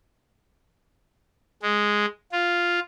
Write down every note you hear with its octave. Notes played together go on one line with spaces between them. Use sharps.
G#3
F4